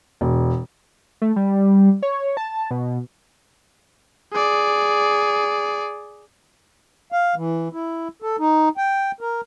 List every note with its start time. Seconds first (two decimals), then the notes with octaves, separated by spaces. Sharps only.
0.21 E1
1.22 A3
1.36 G3
2.03 C#5
2.37 A5
2.71 B2
4.33 G#4 D5
7.12 F5
7.36 E3
7.73 E4
8.22 A4
8.39 D#4
8.77 G5
9.21 A#4